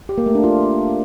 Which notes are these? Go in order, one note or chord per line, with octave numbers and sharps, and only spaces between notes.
G4
A#3
A3
D4
F4